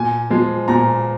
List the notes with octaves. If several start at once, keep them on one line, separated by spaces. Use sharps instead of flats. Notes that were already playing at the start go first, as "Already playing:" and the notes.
Already playing: A#2 G#5
F3 G#3
A#2 A#5